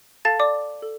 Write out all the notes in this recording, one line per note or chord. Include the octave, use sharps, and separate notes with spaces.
A4 F5 A5 A6
D5 D6
A4